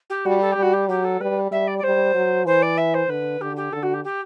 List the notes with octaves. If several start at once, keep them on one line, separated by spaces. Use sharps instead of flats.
G4
G3 F#4
A4
G4
G3
F#4
G4
F#3 G4
A4
G3 B4
G3 E5
D5
D5
G3 C5
F#3
E3 C5
D5
E5
C5
D3 B4
D3 G4
G4
D3 A4
F#4
G4
G4